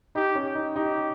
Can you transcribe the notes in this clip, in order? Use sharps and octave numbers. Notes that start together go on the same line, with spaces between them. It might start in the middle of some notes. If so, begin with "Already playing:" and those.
D#4 G4
C#4
G4
D#4
D#4 G4